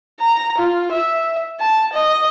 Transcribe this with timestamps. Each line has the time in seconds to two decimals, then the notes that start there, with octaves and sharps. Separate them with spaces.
0.20 A#5
0.58 F4
0.92 E5
1.60 A5
1.93 D#5